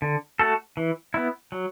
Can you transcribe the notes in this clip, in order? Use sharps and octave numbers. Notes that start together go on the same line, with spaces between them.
D3
A3 F#4 A4
E3
B3 E4
F#3